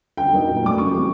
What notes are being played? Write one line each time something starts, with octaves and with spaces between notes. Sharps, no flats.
D3 G5
F#3 A#3 D#4
A#2
F#3 A3 D4 D6
C#3 C#6
E3 G3 C4